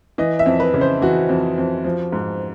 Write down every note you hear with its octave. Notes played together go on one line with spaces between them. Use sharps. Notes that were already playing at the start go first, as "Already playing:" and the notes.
E3 D#5
E5
F2
B4
C#3
C5
E3 F#4
F2
F2
F3
G#2